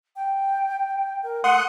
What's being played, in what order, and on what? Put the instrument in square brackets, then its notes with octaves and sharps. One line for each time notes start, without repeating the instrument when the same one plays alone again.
[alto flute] G5
A#4
[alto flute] A3 [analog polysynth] F#5 C6 D#6